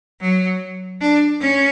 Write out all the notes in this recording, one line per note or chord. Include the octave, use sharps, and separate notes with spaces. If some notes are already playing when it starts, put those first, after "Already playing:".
F#3
D4
C#4